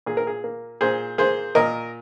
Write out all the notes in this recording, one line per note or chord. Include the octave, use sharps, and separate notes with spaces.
A#2 G#4
A#4
G#4
A#3
A#2 G#4 C5
A#3 G#4 C5
A#2 A#4 D#5